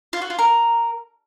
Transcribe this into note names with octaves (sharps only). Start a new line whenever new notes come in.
F4
F#4
F4
A#4